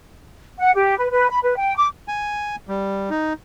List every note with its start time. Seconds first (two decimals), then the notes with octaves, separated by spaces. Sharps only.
0.59 F#5
0.74 G4
0.98 B4
1.11 B4
1.30 B5
1.43 B4
1.57 G5
1.77 D6
2.08 G#5
2.69 G3
3.10 D#4